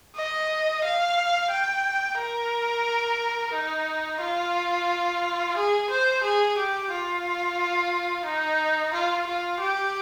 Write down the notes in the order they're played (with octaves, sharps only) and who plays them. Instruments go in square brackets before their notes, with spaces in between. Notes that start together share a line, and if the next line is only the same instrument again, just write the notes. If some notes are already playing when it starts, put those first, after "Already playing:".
[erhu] D#5
F5
G5
A#4
D#4
F4
G#4
C5
G#4
G4
F4
D#4
F4
F4
G4